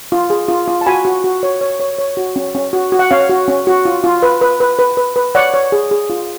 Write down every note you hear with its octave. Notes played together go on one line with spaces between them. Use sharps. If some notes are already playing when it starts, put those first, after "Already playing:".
F4
G#4
F4
F4
A5
F#4 G#5 B5
F#4
F#4
C#5
C#5
C#5
C#5
F#4
C#4
C#4
F#4
F#4
F#5
C#4 C#5 F5
F#4
C#4
F#4
F4
F4
B4
B4
B4
B4
B4
B4
C#5 D5 F#5
C#5
G#4
G#4
F4